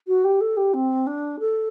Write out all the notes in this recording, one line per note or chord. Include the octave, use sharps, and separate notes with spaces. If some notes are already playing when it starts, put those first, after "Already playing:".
F#4
G4
A4
G4
C4
D4
A4